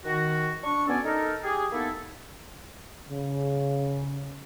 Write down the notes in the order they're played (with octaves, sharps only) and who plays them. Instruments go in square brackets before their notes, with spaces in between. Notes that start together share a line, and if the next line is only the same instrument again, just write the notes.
[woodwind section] D#3 F#4
D4 C#6
B2 B3 C#4 A4 D5 G#5
D#4 A4 A#4
G4 G#4
A#3 B3 D#4 E4 A4
[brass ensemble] C#3